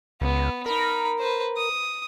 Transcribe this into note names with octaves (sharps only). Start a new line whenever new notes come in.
C#2 B3
D#4 A#4 B5
B4 C5
D#6